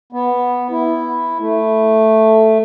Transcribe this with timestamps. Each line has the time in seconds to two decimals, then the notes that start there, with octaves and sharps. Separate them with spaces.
0.13 B3
0.71 E4
1.39 A3